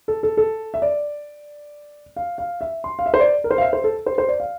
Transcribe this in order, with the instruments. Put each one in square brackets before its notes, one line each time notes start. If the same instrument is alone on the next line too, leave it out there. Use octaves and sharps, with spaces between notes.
[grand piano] A4
A4
A4
E5
D5
F5
F5
E5
C6
F5
E5
C5
D5
A#4
C5
F5
E5
C5
A4
C5
C5
D5
F5